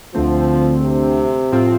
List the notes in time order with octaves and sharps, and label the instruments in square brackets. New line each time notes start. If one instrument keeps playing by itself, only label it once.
[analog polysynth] D2 D3 A3 C4 [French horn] F3
[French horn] C3
[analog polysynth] A2 F3 C4 F4